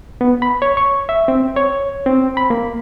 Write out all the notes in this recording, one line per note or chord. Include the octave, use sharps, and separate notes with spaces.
B3
B5
C#5
C#6
E5
C4
C#5
C4
B5
A#3